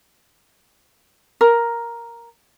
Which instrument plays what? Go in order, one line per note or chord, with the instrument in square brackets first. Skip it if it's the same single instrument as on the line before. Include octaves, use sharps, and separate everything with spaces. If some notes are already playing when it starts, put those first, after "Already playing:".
[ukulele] A#4